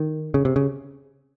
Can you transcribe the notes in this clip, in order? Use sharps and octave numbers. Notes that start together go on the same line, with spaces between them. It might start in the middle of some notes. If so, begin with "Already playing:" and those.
Already playing: D#3
C#3
C3
C#3